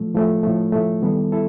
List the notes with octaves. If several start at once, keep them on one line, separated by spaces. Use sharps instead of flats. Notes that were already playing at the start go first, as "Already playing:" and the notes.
Already playing: A2 F3 A3
A2 F3 A3
A2 F3 A3
A2 F3 A3
D#3 G3 B3 E4 A4
E4 A4